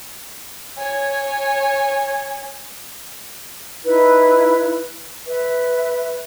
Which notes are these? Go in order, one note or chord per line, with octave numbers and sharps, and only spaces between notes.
C#5 G#5
D#4 E4 B4
B4 E5